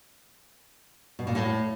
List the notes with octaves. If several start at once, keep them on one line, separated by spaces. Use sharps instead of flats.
B2
A#2
A2